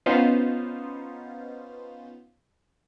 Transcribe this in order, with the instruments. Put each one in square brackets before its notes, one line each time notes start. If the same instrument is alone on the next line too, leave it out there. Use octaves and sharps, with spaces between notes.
[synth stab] B3 C#4 D#4 F4 C5